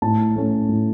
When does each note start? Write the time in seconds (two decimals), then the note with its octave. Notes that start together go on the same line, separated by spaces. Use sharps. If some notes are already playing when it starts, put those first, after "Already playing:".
0.02 A2 A5
0.36 A3 C#4
0.69 A2